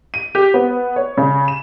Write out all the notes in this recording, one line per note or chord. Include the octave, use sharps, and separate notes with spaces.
D#7
G4
B3
C#5
C#3
E7